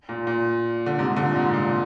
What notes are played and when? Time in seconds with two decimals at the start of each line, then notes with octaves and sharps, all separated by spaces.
0.09 A#2
0.27 A#2
0.86 D3
0.99 G#2 C3
1.16 A#2 D3
1.35 G#2 C3
1.46 G#2
1.54 A#2